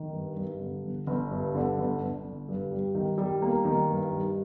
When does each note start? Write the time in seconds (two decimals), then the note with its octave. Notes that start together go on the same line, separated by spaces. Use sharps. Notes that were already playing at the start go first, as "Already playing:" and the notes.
Already playing: D#3
0.13 G2
0.37 G2
0.61 D3
0.84 G1
1.07 G1
1.31 G2
1.55 D3
1.78 G1
2.01 G1
2.24 D3
2.49 G2
2.71 G3
2.95 D#3
3.18 G3
3.42 A#3
3.65 D#3
3.89 G2
4.12 G3